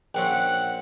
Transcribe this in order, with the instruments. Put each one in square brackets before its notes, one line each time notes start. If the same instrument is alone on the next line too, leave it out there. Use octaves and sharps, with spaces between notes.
[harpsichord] A#1 C4 C#4 [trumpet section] F#5 [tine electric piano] G5